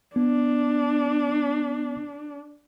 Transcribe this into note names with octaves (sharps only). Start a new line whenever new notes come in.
B3 D4